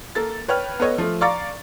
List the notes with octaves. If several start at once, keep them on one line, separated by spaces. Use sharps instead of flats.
A#3 A4 A6
B4 C#5 G5 F6
B3 A4 C#5 D#5
F3 A3
D5 F5 A#5 C#6 D6 A6